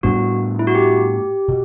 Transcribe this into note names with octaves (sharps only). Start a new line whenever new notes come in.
A2 G3 B3 D4 F#4
E4
F#4
G4
B2